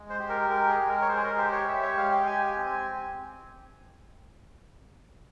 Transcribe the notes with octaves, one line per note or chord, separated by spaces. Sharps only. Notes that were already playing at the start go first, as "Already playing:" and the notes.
Already playing: G#3
C5
G4
A#4
G#3 A#4
G#4
G#3
A#4
C#5
G#3 C5
G#4
A#4
G4 C5
C#5
G4 E5
C#5
G#3 F5
G5
G4 G#5
G#5
C4
G#5